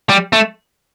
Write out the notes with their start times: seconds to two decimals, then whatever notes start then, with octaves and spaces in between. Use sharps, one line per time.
0.09 G3
0.33 A3